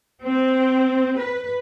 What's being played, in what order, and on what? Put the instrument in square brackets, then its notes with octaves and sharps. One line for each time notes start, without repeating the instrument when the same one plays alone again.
[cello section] C4
B4